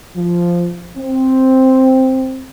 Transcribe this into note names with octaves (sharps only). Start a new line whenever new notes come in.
F3
C4